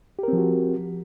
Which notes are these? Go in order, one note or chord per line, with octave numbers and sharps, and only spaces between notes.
F3 C4 F#4 G4 A#4